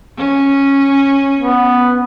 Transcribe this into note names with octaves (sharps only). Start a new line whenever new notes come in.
C#4
B3